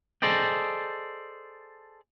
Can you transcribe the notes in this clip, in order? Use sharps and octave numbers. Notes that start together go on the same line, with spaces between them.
G#4 A4 C5 D5 D#5 G5